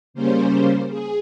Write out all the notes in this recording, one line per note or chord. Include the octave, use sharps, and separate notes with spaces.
C#3 G3 A#3 C#4 C5
G#4